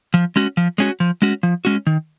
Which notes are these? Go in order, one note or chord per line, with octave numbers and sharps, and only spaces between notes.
F3
G#3 C#4 F#4
F3
G#3 C#4 F#4
F3
G#3 C#4 F#4
F3
G#3 C#4 F#4
D#3